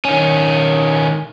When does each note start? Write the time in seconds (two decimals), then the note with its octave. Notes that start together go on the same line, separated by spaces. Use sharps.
0.05 D#3 C#4